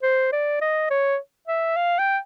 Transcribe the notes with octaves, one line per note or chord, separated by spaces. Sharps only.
C5
D5
D#5
C#5
E5
F5
G5